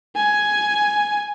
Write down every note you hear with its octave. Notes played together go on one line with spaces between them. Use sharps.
G#5